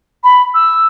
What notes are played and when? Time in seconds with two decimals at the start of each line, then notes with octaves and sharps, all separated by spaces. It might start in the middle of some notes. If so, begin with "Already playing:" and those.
0.23 B5
0.54 E6